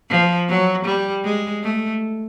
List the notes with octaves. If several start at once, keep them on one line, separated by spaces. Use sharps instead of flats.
F3
F#3
G3
G#3
A3